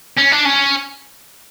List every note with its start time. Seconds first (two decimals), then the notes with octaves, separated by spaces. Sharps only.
0.17 C#4
0.31 D4
0.45 C#4